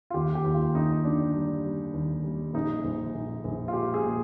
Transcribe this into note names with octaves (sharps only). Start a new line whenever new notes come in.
F4
D#2 G4
G4
D#2
F4
D#2 D#4
D3 D4
G3
G3
D#2
G3
A#1 D#4
A#1
A#1
A#1
F4
G#3 G4
G#4
A#2